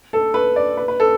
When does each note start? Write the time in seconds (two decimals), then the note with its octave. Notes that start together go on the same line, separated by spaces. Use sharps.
0.13 A4
0.34 B4
0.56 D5
0.77 B4
0.88 B4
1.00 A4